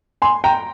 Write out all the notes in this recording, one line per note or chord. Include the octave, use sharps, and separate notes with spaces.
G#5 C6
G5 A#5